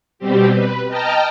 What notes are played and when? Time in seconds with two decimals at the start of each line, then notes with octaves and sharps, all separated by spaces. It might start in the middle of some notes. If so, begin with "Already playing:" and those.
0.19 B2 G3 C4 G4
0.52 B4
0.88 D#5 G5 A5 A#5 F6